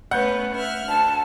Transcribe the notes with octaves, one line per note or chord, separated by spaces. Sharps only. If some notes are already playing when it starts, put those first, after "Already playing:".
A3 B3 C#4 F#5 G6
E5 F6 F#6
D2 A5